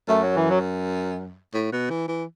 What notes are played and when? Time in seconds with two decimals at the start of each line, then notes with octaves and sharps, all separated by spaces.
0.08 F#2 A3
0.22 F#3
0.36 E3
0.49 F#3
1.54 A2
1.72 B2
1.90 E3
2.08 E3